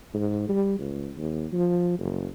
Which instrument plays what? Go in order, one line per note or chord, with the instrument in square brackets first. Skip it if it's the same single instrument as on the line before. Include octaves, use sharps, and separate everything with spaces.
[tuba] G#2
G3
C#2
D#2
F3
F#1